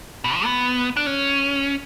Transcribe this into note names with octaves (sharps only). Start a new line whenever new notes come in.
B2
F3
B3
D4
C#4